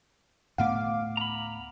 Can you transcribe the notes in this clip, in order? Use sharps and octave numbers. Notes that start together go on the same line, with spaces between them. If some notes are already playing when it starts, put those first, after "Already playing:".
D2 A2 B3 F5 F#5 D6
A#5 B5